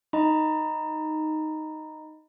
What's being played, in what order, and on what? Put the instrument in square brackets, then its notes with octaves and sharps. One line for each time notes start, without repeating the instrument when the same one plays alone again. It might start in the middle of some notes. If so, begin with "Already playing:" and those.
[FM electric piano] D#4 [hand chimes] D#5 A#5 B5